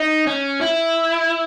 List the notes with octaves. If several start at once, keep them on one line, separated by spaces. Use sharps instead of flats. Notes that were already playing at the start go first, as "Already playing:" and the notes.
Already playing: D#4
C#4
E4